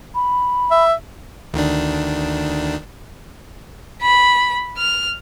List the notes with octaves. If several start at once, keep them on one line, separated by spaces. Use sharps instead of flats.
B5
E5
D2 D#3 D4
B5
F6